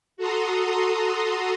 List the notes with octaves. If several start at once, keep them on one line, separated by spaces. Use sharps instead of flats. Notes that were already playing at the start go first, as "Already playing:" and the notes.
F#4 A4 A#5 C6 D#6